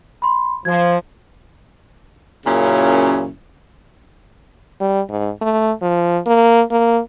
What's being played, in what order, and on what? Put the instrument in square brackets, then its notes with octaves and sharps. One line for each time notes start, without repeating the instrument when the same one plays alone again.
[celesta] B5 C6
[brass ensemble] F3 [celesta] G#6
[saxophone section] F#2 A#2 C#3 C#4 E4
[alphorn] G3
G#2
A3
F3
A#3
A#3